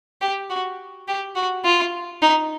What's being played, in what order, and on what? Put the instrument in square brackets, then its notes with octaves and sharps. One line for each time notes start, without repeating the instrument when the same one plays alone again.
[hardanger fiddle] G4
F#4
G4
F#4
F4
D#4